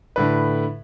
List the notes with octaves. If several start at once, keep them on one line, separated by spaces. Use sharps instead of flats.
A2 D3 B4